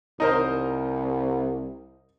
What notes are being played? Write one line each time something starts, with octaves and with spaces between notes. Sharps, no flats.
C2 D#4 A#4 C5